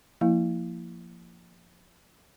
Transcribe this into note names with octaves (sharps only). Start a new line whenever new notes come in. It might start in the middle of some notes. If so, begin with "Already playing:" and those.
F3 A#3 E4 F5